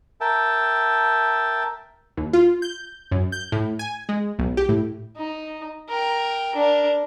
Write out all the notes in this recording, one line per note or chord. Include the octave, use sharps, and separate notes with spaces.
A#4 E5 G5 A5
D#2
F4
G6
F#2
G6
A2
G#5
G#3
B1
G4
A2
D#4
A#4 G5
D4 A#4